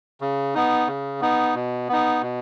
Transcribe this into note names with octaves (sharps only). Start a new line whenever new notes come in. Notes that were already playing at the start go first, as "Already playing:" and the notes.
C#3
B3 D#4
C#3
B3 D#4
B2
B3 D#4
B2